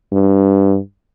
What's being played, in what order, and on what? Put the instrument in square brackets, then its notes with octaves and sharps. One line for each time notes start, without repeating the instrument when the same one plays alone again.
[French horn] G2